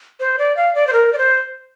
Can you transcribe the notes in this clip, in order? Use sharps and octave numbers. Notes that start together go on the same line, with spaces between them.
C5
D5
F5
D5
C5
A#4
D5
C5